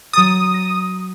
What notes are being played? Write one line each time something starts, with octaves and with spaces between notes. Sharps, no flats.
F#3 A#5 D#6 A6
A#6